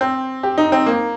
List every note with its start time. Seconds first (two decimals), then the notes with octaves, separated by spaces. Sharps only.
0.01 C4
0.43 G4
0.58 D#4
0.72 C4
0.86 A#3